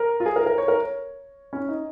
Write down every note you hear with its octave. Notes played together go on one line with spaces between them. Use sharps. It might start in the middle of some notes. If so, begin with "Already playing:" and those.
Already playing: A#4
F4
G#4
A#4
A#4
C#5
A#4
C#5
C#4
D#4